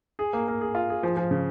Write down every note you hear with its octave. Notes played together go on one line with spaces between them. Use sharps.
G#4
A#3
A#3
G#4
F4
G#4
F3
F3
C#3